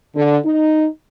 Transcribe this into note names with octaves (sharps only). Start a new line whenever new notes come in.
D3
D#4